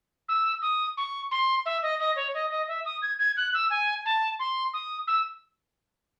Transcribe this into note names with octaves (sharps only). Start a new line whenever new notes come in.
E6
D#6
C#6
C6
E5
D#5
D#5
C#5
D#5
D#5
E5
D#6
G#6
G#6
F#6
E6
G#5
A5
C6
D#6
E6